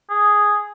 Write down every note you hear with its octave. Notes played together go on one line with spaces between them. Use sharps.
G#4